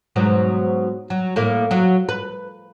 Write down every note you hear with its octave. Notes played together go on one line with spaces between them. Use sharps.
G#2 B2 F#3
F#3
A2 A#3
F#3
B4